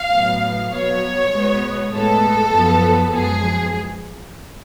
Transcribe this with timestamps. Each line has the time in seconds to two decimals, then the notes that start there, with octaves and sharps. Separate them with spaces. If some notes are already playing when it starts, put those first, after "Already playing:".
Already playing: F5
0.12 A2 F#3 B3
0.72 B2 F#3 B3 C#5
1.33 B2 G#3 B3
1.93 A2 G#3 B3 A4
2.53 F#2 F3 B3
3.13 F#2 F3 G#3 B3 G#4